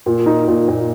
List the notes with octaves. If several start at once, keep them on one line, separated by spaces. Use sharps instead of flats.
A#2
D#4
A#2
A#2